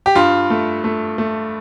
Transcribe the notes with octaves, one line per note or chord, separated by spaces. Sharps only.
G4
G2 F4
A3
A3
A3